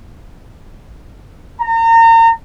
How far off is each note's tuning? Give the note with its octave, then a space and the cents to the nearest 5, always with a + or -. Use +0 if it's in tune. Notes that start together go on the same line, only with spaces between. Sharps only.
A#5 -35